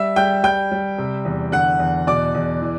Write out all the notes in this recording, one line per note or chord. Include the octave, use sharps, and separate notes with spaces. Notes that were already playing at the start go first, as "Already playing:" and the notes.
Already playing: G3 E5 E6
G3 G5 G6
G3 G5 G6
G3
C3
E2
D3 F#5 F#6
E2
B2 D5 D6
E2
E3